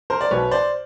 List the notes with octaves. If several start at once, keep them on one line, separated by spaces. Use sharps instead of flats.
A#4 C5
D5
B1 B2 B4 C#5
C5 D5